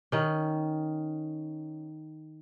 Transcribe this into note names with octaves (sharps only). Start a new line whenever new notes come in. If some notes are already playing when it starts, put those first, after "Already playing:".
D#3 C#4